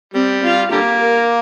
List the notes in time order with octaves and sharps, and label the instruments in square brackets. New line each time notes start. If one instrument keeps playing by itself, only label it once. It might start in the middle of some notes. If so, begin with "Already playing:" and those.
[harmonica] G3 [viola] C4
[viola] F4
[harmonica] D3 G3 A#3 [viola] G4
[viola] A#4